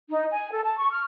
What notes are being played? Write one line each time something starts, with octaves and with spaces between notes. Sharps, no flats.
D#4
G#5
A4
A5
C#6
F6